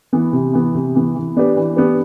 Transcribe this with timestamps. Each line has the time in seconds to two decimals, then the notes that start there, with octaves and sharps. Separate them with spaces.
0.13 E3 B3
0.33 C3
0.53 E3 B3
0.75 C3
0.95 E3 B3
1.15 E3
1.36 B3 D4 G4 B4
1.57 E3
1.76 B3 D4 G4 B4